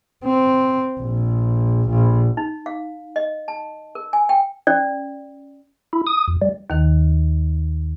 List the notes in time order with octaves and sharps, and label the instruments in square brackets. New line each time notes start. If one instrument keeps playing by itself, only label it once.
[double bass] C4
A#1
A#1
[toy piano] D#4
F5
D#5
A5
A#4
G#5
G5
C#4 D5
[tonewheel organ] E4
D#6
F2
G3
[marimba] D#2 D#3